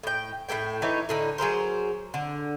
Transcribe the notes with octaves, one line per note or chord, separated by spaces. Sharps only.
A2 G5
A2 A3 A#3 G5
E3 A3 D#4 C#5
A2 D3 D#4
F#3 G#4 A#4 C5
D3